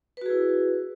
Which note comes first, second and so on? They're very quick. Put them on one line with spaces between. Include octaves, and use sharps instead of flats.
B4 F#4 G#4 E4